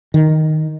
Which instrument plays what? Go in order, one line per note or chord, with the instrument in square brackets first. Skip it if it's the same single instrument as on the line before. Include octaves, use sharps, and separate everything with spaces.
[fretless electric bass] D#3